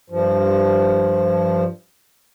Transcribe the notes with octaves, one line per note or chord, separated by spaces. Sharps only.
G2 F3